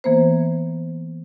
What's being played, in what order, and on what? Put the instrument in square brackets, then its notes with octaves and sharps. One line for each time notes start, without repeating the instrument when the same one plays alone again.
[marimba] E3 A#3 B3 C5